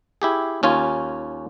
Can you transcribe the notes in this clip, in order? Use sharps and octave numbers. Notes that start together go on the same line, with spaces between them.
E4 G4 G#4
D#2 C#4 F4 G#5